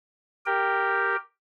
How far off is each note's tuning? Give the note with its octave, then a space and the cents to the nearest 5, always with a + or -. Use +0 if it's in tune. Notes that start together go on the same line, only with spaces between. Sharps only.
G4 +0 A#4 -5 G5 +0